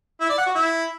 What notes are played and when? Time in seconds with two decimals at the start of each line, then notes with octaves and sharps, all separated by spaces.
0.21 E4
0.29 D5
0.38 F#5
0.46 F#4
0.55 E4